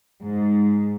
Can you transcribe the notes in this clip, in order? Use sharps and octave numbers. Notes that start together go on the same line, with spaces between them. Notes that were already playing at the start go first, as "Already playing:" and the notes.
G#2